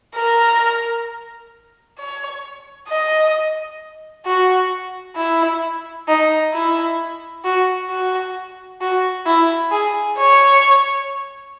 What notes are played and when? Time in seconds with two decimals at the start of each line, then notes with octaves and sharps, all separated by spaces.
0.16 A#4
1.99 C#5
2.89 D#5
4.26 F#4
5.16 E4
6.08 D#4
6.54 E4
7.44 F#4
7.90 F#4
8.81 F#4
9.26 E4
9.72 G#4
10.18 C#5